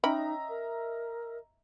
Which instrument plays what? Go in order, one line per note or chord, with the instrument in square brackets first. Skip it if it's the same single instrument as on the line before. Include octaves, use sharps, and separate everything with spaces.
[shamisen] C#4 G5 B5 [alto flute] D#4 [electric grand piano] D#5 E5 A#5
[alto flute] A#4